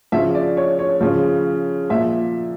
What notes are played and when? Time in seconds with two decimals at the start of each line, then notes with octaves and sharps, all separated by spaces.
0.12 C#3 F3 E5
0.35 D5
0.57 C#5
0.79 C#5
1.01 C#3 F3
1.89 A#2 F3 E5